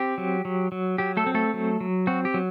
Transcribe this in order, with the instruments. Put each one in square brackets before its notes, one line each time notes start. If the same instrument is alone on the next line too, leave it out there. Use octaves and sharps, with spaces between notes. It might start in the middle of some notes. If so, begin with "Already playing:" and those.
Already playing: [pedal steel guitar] C4 G4
F#3
F#3
F#3
F#3 G4
A3 A4
C4
A3 A4
F#3
F#3
C4 F#4
G4
F#3